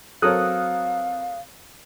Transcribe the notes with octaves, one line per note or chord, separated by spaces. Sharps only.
F#3 C4 A4 A#4 C#5 F5 D#6 F#6